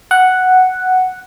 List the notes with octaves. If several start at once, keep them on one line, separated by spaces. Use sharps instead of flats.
F#5